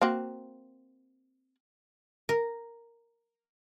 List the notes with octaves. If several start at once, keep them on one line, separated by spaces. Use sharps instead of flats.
A#3 C4 F#4
A#4